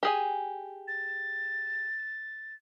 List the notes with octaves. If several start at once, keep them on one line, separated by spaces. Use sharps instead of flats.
G4 G#4 G#5
A6